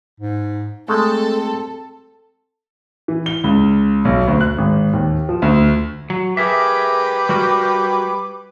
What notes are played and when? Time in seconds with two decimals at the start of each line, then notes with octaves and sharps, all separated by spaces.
0.20 G#2
0.88 G#3 A3 C4 A4
3.08 E3
3.26 G7
3.44 C#2
4.05 B1
4.27 D2
4.41 F#6
4.58 G#1
4.93 D#2
5.29 F3
5.42 D2
6.10 F#3
6.37 G4 G#4 A#4 B4 E5 D6
7.29 G3 F#4 A#4